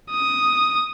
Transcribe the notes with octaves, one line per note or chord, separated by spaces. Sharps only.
D#6